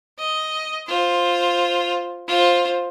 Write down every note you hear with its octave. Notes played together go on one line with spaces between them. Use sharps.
D#5
F4 C5
F4 C5